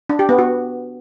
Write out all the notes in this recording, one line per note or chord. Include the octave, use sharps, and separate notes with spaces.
D4
G4
B3
F#4